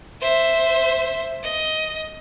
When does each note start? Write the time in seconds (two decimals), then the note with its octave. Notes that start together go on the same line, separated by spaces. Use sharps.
0.21 C5 E5
1.43 D#5